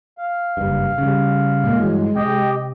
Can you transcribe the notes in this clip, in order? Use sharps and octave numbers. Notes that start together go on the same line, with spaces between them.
F5
F#1 G2
C#3 G3
A#2 G#3 A#3
G2 E3 F#3
C3 G4 D#5 G5